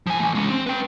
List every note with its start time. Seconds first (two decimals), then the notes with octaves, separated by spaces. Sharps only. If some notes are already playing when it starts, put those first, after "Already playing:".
0.07 F3 G#5
0.20 E3 A3
0.35 G#3 C#4
0.50 C4
0.66 B4 G5